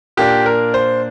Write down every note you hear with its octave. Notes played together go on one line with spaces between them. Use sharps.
A#2 A#3 D4 G4
A#4
C5